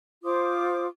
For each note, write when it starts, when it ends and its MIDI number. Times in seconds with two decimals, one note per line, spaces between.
0.25 0.86 65
0.25 0.86 72
0.25 0.86 86
0.25 0.86 87